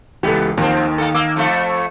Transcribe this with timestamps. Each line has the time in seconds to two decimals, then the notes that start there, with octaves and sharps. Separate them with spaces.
0.23 C#2 E3 B3 G4 A4
0.57 D#2 D#3 F3 C4
0.98 A#3 A4
1.15 A#3 D6 E6
1.36 F2 A3 E5